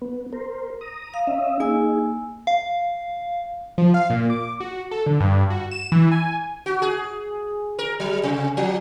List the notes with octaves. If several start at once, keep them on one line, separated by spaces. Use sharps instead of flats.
B3
A#4 C5
A#5 D#6
F5
C#4 D#5 E5
A#3 D#4 G#4 G#5 E6
F5
F3
F5
A#2
D6
F#4
A4
D3
G2
F#4
E7
E3
G#5
F#4
G#4
A#4
F#3
C3
F3